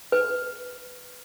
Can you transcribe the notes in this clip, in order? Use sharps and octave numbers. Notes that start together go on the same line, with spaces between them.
B4